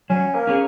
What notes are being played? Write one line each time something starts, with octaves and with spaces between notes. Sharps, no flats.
F#3 C#4
A#3
C#4 G#4 C#5